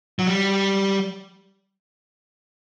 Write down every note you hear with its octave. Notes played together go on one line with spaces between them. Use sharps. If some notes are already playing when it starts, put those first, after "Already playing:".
F#3
G3